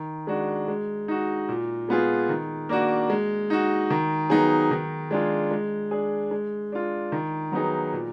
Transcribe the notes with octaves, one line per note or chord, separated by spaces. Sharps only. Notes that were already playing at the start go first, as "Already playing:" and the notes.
Already playing: D#3
G#3 D4 F#4
G#3
D#4 F#4
A#2
G#3 B3 F4 G#4
D#3
A#3 D4 F#4
G#3
D#4 F#4
D#3
F#3 B3 D#4 G#4
D#3
G#3 D4 F4 G#4
G#3
D4 G#4
G#3
D4 F4
D#3
F#3 B3 D#4 G#4
A#2